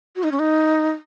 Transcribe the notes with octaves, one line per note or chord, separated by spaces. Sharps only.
F#4
D#4
C#4
D#4